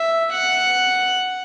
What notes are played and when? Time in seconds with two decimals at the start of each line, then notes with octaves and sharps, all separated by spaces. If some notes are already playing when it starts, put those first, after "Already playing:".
Already playing: E5
0.33 F#5